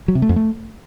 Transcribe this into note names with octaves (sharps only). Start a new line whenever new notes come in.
F#3
C3
A3
F2
A3